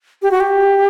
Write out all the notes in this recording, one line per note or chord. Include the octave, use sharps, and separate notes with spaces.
G4
F#4
G4